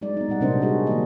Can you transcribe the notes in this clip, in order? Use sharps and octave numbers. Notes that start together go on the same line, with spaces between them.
F#3 G#3 D#4 D5
B3 D#4
A#2 G3 F#5
C3 F#3 D4 A#4 C5 D#5
G3 D4 F#4 G#4
D#3 F#3 A#3 D#5